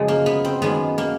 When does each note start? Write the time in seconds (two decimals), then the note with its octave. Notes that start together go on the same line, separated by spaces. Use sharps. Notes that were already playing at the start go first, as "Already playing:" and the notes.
Already playing: F#2 C#3 F3 G#3
0.08 A#3
0.26 B3
0.45 C4
0.62 F#2 D#3 G#3 B3
0.98 A#3